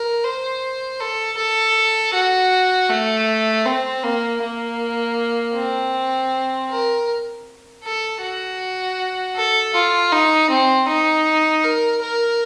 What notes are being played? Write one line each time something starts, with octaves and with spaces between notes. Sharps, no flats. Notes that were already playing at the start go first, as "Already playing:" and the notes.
Already playing: A#4
C5
A4
A4
F#4
A3
C4
A#3
A#3
C4
A#4
A4
F#4
A4
F4
D#4
C4
D#4
A#4
A#4